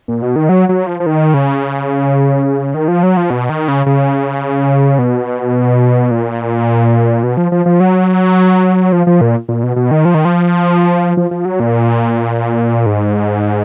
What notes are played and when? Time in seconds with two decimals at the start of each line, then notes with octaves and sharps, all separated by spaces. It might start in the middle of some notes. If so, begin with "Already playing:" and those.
0.08 A#2
0.22 B2
0.36 D#3
0.49 F#3
0.69 F#3
0.87 F3
1.00 F3
1.06 D#3
1.34 C#3
2.74 D#3
2.88 F3
3.03 F#3
3.17 F3
3.30 B2
3.49 D#3
3.68 C#3
3.86 C#3
4.99 B2
6.11 A#2
7.23 B2
7.37 F3
7.52 F3
7.66 F3
7.80 F#3
8.92 F3
9.07 F3
9.21 A#2
9.49 A#2
9.63 B2
9.76 B2
9.91 D#3
10.05 F3
10.14 D#3
10.25 F3
11.17 F3
11.31 F3
11.45 F#3
11.60 A#2
12.86 G#2